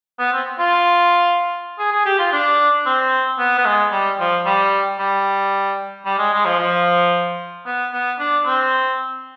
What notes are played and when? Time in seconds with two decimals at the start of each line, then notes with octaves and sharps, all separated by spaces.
0.19 B3
0.33 C4
0.59 F4
1.79 G#4
1.92 G#4
2.06 G4
2.19 F4
2.33 D4
2.86 C4
3.39 B3
3.58 B3
3.66 G#3
3.92 G3
4.19 F3
4.45 G3
4.99 G3
6.06 G3
6.18 G#3
6.33 G#3
6.45 F3
6.59 F3
7.66 B3
7.93 B3
8.19 D4
8.46 C4